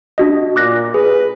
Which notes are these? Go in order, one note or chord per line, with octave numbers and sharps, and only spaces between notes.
D4 F#4 D#5
A#2 D6 F#6 A#6
G#4 B4